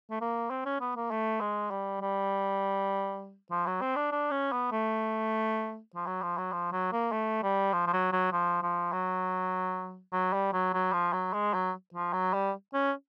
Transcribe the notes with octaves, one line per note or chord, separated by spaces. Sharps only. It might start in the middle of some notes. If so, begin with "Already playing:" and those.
A3
A#3
C4
C#4
B3
A#3
A3
G#3
G3
G3
F3
F#3
C4
D4
D4
C#4
B3
A3
F3
F#3
F3
F#3
F3
F#3
A#3
A3
G3
F3
F3
F#3
F#3
F3
F3
F#3
F#3
G3
F#3
F#3
F3
F#3
G#3
F#3
F3
F#3
G3
C#4